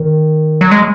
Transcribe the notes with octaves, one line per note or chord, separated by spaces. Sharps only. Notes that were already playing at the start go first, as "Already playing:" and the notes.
Already playing: D#3
F#3
G#3